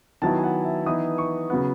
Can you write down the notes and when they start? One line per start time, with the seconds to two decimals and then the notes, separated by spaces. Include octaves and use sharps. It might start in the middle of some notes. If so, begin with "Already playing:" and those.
0.22 D#3 F#3 B3 E4 A5
0.38 G#5
0.44 F#5
0.65 E5
0.86 E3 B3 D#4 D#6
1.18 C#6
1.50 C#3 F#3 B3